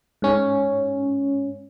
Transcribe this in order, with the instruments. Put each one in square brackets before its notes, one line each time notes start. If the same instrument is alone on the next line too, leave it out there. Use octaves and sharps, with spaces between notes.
[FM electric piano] G#2 C#4